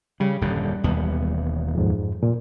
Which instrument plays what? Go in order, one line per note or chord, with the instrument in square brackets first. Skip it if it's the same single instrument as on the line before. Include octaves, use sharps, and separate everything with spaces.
[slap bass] C#3 [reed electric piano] G3
[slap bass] D#1 F#2 D3
E1 D#2 B3
[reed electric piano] F2 G#2
A#2